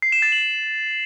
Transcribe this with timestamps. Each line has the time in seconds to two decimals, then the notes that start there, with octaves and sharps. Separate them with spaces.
0.02 C7
0.12 E7
0.22 A6
0.32 F#7